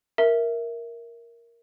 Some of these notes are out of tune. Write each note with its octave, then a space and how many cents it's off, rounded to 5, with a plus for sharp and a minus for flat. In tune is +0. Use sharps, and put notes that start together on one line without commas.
A#4 +0 E5 +0